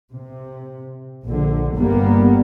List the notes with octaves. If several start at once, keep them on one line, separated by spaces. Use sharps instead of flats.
C3
A#1 D3
G1 G2 G3 A#3 B3